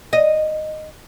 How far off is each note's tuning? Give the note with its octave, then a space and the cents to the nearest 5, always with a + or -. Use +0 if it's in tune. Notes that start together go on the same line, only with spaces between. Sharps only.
D#5 -10